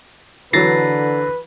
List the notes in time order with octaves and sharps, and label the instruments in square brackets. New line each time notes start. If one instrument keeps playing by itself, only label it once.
[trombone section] D3 [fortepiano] E3 F#3 [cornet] B4 [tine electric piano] A6 A#6 C7